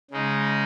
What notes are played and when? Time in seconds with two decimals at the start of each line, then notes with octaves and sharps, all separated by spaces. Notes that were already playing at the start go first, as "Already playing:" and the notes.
0.11 C#3 G#3 D#4